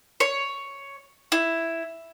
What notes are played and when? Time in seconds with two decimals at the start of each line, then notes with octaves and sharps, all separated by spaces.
0.20 C#5
1.32 E4